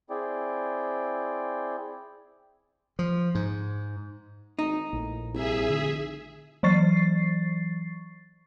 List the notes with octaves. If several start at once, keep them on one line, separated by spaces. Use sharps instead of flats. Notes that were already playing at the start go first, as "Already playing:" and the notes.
C4 E4 G#4 D5 G5
F3
G#2
G#1 D#4
A#1 A2
C2 G#4 E5
F1 D3
E3 F#3 C#6 A6 C7